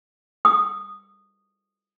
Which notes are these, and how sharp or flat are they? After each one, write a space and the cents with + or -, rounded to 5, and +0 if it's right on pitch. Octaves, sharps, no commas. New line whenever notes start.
D#6 -10